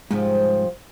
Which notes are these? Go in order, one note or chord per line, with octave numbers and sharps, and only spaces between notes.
G#2 C3 F3 G3